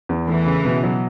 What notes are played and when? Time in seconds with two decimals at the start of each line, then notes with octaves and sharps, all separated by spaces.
0.09 E2
0.28 E3 A3
0.46 C#3
0.65 B2
0.83 F#3